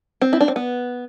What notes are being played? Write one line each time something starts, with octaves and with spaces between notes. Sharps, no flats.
C4
E4
D4
C4
B3